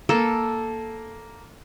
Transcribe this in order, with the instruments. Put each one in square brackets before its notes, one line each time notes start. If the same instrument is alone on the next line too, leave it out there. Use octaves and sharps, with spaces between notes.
[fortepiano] A#3 [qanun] A4